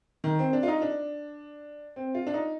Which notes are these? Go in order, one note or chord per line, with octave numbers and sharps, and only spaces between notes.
D#3
C4
D4
F4
D#4
D4
C4
F4
D4
D#4